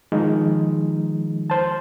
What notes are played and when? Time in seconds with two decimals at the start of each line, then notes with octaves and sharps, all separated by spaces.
0.12 D#3 F3 G#3 D#4
1.50 C5 A5